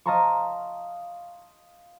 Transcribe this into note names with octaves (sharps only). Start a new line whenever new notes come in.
D#5 F5 A5 A#5 C6 C#6